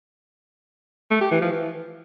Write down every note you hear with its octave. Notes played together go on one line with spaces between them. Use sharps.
A3
G4
E3
F3
E3